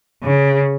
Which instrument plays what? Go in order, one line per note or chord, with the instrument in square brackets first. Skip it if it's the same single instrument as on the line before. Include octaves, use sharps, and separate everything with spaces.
[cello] C#3